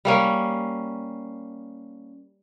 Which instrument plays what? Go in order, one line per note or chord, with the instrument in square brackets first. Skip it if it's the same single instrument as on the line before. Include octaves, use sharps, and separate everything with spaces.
[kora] G3 A#3 C#4